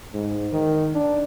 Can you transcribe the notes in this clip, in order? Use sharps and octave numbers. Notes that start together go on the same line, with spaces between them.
G#2
D#3
D4